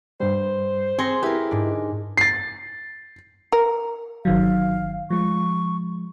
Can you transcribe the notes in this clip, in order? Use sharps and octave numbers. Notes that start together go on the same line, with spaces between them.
G2 G3 C5
C4 G#4 C6 A#6 C#7
E4 G4 A#4 B4
G#2 D4
A6 C7
A#4
G1 D#3 F#3 F5
F3 G#3 C#6